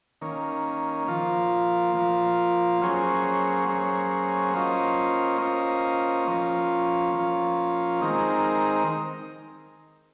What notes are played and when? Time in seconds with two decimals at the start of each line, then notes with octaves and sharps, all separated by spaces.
0.21 D#3 A#3 C#4
1.08 F3 A#3 F4
1.95 F3 A#3 F4
2.81 F#3 A#3 C#4 G#4 C5
3.68 F#3 A#3 C#4 G#4 C5
4.54 A#3 C#4 F4 C5 D#5
5.41 A#3 C#4 F4 C5 D#5
6.28 F3 A#3 C#4 F4
7.14 F3 A#3 C#4 F4
8.01 D#3 G#3 C4 D#4 A#4